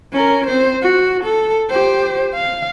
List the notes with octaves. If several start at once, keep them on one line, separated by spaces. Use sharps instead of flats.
C#4 A#4
C4 C5
F#4
A4
G4 C5
F5